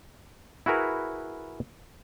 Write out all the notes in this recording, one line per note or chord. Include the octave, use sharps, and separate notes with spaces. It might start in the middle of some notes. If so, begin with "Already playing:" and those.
E4 F#4 G#4 A#4 B4